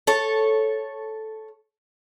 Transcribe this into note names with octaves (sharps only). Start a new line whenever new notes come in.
A4 C#5